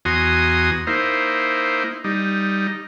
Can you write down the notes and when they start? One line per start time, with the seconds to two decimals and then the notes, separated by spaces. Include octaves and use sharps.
0.05 E2 F#4 G#5 A#5 C6 D#6
0.87 A#3 D#4 E4 C5
2.04 G3 D#4